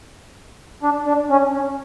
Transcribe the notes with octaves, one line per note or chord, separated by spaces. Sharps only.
D4
D4
C#4
C#4